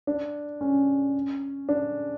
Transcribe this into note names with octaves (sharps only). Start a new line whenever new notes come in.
D4
C#4
D4